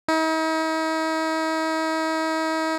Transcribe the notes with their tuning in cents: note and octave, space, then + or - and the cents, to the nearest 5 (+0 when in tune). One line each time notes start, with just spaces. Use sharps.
D#4 +45